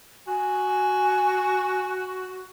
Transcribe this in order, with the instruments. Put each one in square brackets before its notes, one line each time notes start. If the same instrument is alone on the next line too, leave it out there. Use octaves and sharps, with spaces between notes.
[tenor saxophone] F#4 [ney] G#5